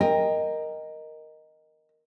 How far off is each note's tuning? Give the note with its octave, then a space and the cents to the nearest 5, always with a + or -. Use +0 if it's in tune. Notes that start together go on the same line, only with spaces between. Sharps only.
A#4 +0 D#5 +0 G5 +15